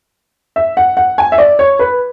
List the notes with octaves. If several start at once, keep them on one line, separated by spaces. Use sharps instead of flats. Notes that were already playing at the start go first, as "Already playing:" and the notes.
E5
F#5
F#5
G#5
E5
D5
C#5
B4